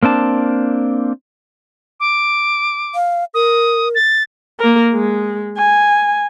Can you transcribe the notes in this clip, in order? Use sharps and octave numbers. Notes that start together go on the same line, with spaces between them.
A#3 C4 D4 A5
D6
F5
A#4 D#6
A6
A#3 A#4
G#3
G#5